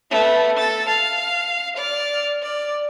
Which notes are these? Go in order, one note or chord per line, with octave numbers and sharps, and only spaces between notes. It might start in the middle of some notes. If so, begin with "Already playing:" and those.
A3 B3
A4 A6
F5
D5 F6
D5